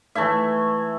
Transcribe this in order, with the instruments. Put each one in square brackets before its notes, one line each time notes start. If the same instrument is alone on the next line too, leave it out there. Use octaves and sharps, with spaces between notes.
[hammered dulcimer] E3 A3 E4 E5